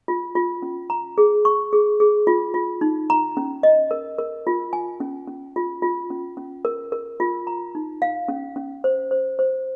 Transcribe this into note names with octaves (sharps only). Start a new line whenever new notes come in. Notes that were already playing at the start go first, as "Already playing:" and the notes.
F4
F4
C#4
A#5
G#4
C#6
G#4
G#4
F4
F4
D#4
A#5
C#4
D#5
A#4
A#4
F4
G#5
C#4
C#4
F4
F4
C#4
C#4
A#4
A#4
F4
A#5
D#4
F5
C#4
C#4
C5
C5
C5